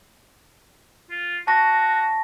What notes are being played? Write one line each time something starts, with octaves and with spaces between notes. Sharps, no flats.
F4
F#4 A5 C#6 A#6